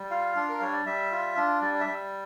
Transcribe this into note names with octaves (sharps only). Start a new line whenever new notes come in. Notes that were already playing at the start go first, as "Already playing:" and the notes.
Already playing: G3
F4 F5
D4
A#4
G3 C#5
D5
G3 E5
F4
D4
G3 D5
D5
E5
G3